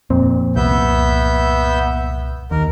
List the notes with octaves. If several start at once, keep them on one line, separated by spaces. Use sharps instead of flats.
F2 A#2 C4
C2 B3 E5 G6
D#2 A#4